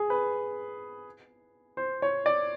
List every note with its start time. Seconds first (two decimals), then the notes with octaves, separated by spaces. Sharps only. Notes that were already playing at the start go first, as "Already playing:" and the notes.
Already playing: G#4
0.10 B4
1.77 C5
2.02 C#5
2.26 D5